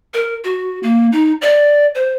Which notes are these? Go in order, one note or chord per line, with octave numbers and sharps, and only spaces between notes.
A#4
F#4
A#3
D#4
D5
C5